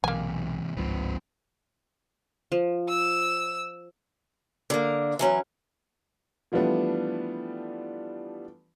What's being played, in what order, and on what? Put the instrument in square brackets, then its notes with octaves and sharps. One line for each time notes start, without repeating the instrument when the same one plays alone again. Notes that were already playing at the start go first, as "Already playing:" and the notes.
[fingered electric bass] B1 [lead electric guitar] G#2 C3 [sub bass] E3 [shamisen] A#3 G#5
[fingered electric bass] G1 G#2 F3 [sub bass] C#2 [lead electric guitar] C4 B4
[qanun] F3
[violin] E6
[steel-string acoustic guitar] D3 A#3
E3 F#3 C#4
[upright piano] E3 F3 G3 A3 B3 D4